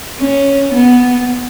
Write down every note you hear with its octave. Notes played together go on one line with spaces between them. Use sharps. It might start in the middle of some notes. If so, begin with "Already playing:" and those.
C#4
B3